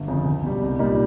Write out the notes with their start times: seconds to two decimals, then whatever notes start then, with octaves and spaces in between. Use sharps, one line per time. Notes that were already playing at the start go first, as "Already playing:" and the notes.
Already playing: G1
0.08 F2 C#3
0.25 C#2
0.43 B2 G3
0.61 C2
0.79 A#2 G3 A#3 D#4